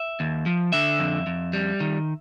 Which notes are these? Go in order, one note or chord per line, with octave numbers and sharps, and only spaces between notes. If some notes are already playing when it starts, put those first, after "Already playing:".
Already playing: E5
D#2
F3
D3 E5
F2
F2
G3
D#3